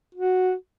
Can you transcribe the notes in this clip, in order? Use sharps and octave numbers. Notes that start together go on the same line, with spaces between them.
F#4